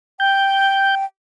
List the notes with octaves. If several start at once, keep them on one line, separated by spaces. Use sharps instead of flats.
G5 G6